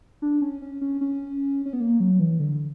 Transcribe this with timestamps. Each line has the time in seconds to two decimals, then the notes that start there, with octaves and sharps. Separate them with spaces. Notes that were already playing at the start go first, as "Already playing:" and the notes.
0.22 D4
0.42 C#4
0.62 C#4
0.81 C#4
1.01 C#4
1.65 C#4
1.73 B3
1.80 A#3
2.00 F#3
2.20 E3
2.40 D3